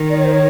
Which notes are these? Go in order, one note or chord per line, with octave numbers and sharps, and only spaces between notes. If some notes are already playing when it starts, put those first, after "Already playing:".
Already playing: D#3
D5
C#5
C5
C#5